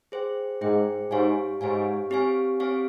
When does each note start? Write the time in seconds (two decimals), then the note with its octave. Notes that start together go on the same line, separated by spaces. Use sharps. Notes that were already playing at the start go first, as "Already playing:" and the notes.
0.12 G#4 C5 G5
0.61 G#2 G#4 C5 G5
1.11 G#2 G4 C#5 F5 G#5
1.61 G#2 G4 C#5 F5 G#5
2.10 C4 G4 C#5 F5 G#5
2.60 C4 G4 C#5 F5 G#5